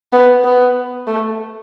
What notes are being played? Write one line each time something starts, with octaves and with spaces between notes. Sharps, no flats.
B3
B3
A3